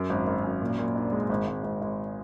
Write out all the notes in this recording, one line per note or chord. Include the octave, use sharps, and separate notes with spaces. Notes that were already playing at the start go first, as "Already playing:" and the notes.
Already playing: F#2 A#4
G#1
G#1
F#2
A#2
A#2
D4
G#3
G#1
G#1
G#1
G#1